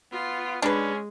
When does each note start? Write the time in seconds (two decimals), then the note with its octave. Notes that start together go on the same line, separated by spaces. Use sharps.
0.12 B3 F4
0.62 G#3 C#4 D4 B4